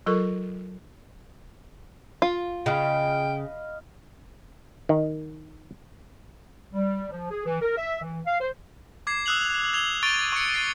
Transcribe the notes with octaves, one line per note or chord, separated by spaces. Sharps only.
F#3 F4 A4 A#4 C#6
F4
C#3 D#5 F5 G5 B5
D#3
G3
F3
G#4
E3
A#4
E5
E3
F5
C5
D6 G#6 C7
D#6 E6 F#6 F7 F#7
G#6 F7 G7
C#6 A6 D7 D#7 G7
C#6 C#7
A6 C7